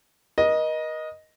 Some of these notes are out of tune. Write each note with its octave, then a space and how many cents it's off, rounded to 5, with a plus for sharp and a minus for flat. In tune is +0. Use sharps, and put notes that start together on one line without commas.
A#4 +45 D#5 +0